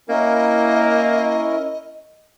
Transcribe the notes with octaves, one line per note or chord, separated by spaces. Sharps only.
A#3 C#4 E4 A#4 D#5